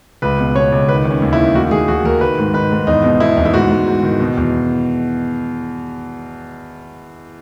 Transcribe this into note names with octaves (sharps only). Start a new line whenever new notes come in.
C#2 B4
B2
B2 C#5
C#2
D#3 B4
D#3
C#4
D#2
E4
D#3
D#2 F#4
D#2 G#4
D#2 F#4
D#2 A#4
D#3 B4
G#2
D#3 B4
G#2
E2 D#4
B2
B2 E4
E2 D#4
E4
G#2 F#4
G#2
G#2
D#3
B2
E2